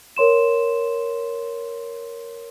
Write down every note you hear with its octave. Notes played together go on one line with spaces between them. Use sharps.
A#4 C#5 C6 E7